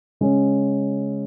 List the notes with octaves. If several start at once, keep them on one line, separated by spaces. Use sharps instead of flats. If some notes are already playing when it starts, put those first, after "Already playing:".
C#3 G#3 C#4